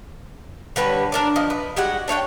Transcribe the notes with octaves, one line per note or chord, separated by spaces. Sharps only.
D3 G3 B4 C#5
D4 A#4 D5
F3 D#5
B4
G3 G#3 F#4 F#5
D4 C#5 F5 G5